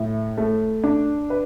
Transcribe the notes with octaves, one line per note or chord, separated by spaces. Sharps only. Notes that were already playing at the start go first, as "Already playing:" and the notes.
Already playing: A2
A3
D4
B4